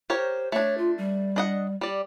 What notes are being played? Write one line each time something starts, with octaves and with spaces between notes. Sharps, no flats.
G4 A#4 C5 C#5
A3 D4 C#5
F4
G3
D4 D#5 F#5
G3 D5